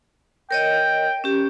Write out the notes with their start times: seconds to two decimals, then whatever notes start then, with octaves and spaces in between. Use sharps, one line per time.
0.51 A#4 C#5 D#5 G5
1.24 C#4 G4